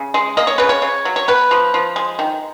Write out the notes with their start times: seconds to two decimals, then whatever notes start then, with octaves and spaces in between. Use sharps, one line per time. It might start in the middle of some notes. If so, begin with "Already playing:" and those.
Already playing: C#3
0.14 G#3
0.37 A#3 D#5
0.47 C#5
0.58 C#3 B4
0.69 C#5
0.82 C#3
1.05 F#3
1.16 C#5
1.28 B3 B4
1.51 F3
1.74 F3
1.96 G#3
2.19 D#3